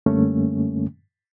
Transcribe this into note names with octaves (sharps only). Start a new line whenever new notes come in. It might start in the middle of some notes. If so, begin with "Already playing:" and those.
F#2 D3 G3 A3 A#3 C#4